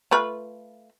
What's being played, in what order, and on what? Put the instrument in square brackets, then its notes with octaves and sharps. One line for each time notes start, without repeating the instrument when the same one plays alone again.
[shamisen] A3 F4 B4